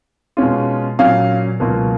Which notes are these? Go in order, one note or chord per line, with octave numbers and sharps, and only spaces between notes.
B2 G#3 C#4 F4
A#2 F#3 C#4 F5
C#2 B2 F#3 A#3 F4